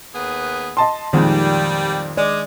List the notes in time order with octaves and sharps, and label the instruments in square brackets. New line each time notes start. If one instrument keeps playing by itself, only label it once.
[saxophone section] D#2 B3 G#4
[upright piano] D#5 A5 C6
[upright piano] F2 A#2 G#3 [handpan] D#3 [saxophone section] G3
[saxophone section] G#3 [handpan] D5